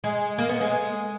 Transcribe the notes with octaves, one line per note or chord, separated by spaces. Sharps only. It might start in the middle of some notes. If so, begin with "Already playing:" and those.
G#3
A#3
B3
G#3